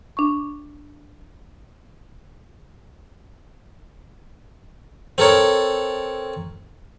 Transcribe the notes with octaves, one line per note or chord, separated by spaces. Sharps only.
D4 C#6
C4 A4 A#4 C#5